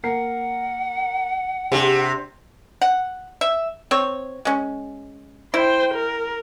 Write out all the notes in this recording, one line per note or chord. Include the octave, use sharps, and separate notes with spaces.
A#3 A#4 F#5 C7
C3 D4 G4 G#4
F#5
E5
C4 C#5
G#3 C#4
E4 C5 G5
A#4